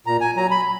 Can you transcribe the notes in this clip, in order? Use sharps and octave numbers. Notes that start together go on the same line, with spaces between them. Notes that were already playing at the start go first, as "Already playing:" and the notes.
A#2 A#5
G#5
F#3 A#5
B5